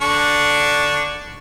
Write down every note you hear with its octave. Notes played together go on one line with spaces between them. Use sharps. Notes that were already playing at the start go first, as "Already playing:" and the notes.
D3 D4 C#6